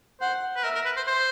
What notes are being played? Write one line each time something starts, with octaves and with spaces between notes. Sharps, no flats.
C5 F#5
B4
A#4 E5
A#4
B4
C5
C5